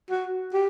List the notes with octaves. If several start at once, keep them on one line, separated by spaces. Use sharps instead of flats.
F#4
G4